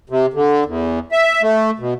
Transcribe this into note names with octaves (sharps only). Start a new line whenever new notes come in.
C3
D3
E2
E5
A3
B2